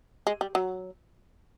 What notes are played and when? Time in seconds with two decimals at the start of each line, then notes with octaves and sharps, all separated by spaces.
0.27 G#3
0.41 G3
0.55 F#3